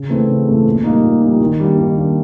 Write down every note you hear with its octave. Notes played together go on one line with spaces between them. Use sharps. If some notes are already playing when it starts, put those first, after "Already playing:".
Already playing: C#3
E3 A3 C4
C#3
E3 A3 C4
A#2
G3 A#3 D#4
A#2
G3 A#3 D#4
D#3
G3 A#3 D4
D#3
G3 A#3 D4